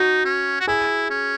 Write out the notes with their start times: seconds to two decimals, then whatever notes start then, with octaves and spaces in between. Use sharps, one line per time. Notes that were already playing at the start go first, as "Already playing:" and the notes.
Already playing: D#4 F#4
0.25 C#4
0.60 F#4
0.67 E4 G#4
1.10 C#4